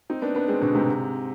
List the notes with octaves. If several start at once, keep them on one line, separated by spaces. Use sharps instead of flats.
C4 D#4
B3 D4
B3 D4
G#3 C4
B2 D3
G#2 C3